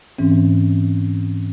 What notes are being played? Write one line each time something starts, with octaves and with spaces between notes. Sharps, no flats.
G#2 E3 C4 C#4